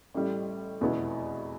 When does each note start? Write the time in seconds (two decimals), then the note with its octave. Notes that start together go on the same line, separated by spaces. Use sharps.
0.14 A1 A2 G3
0.81 F1 E2 B2 B3 E4